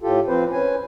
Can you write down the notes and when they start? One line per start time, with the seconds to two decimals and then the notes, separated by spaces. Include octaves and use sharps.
0.01 A2 F4 G4 A4
0.27 F3 C4 B4 C5
0.52 C#4 B4 G#5